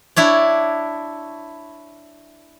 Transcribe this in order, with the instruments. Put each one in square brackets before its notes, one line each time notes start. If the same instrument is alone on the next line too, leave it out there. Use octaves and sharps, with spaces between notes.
[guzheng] D4 E4 C#5 D5